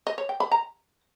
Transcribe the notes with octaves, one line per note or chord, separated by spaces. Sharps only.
D#5
C#5
G5
B5
A#5